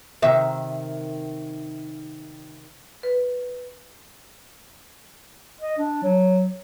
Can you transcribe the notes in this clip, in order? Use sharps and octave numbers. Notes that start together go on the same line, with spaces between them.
C3 D#3 E5
B4
D#5
D4
F#3